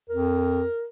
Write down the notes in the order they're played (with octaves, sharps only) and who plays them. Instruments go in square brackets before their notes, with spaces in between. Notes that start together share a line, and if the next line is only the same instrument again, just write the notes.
[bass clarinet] F2 [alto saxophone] A#4